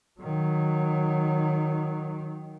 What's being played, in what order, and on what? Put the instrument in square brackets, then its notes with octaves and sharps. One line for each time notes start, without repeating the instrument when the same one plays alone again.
[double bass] D#3 F#3